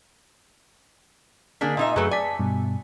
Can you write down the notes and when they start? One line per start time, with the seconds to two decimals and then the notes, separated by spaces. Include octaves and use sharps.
1.61 D3 A#3 D4 G#4 B6
1.77 A#2 D#4 D#5 E5
1.96 F#2 F#3 A3 G#4 B4
2.11 D5 G#5 A5 B6
2.39 G2 B2